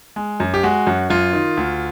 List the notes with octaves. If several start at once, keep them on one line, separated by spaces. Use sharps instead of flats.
G#3
F#2
G4
G#3 F#4
F#2
F#2 F4
D#3
D2